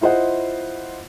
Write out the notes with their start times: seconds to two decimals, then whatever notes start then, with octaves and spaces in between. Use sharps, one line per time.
0.01 E4 F4 C5 D#5 F#5